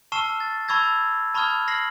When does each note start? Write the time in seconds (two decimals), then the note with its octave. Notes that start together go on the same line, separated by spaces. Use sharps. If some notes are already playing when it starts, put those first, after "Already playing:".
0.12 A5 C#6 E6 F6 C7 E7
0.40 A6
0.68 A5 B5 C#6 E6 G#6 A#6
1.34 A5 B5 C#6 D#6 F6 G#6
1.68 F6 A#6 C7 F#7